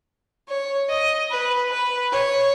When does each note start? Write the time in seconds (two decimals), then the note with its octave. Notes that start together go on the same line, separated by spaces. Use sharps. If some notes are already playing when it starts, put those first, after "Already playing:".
0.49 C#5
0.89 D#5
1.30 B4
1.71 B4
2.12 C#5